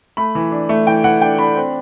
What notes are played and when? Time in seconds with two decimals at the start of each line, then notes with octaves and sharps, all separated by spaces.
0.17 A3 B5
0.35 E3
0.52 D4
0.69 A3
0.87 E3 G5
1.04 E3 F#5
1.21 D4 G5
1.39 D4 B5
1.56 C4